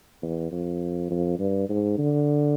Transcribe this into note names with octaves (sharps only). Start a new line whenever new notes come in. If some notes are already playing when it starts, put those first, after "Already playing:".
E2
F2
F2
G2
G#2
D3